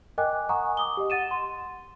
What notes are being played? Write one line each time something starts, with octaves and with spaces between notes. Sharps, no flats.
A#4 D#5 G5 G#5 D6 F#6
F#5 G#5 A#5 C#6 D#6
D6 D#6 G7
G4 D#5
F#5 A6 D#7 E7
C6